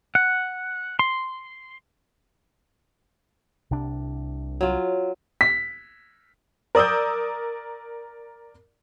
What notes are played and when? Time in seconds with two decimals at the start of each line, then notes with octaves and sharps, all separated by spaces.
0.15 F#5
0.99 C6
3.71 C2 C3 D4
4.61 F#3 F4
5.41 B6
6.75 A#4 D5 D#6 E6 G6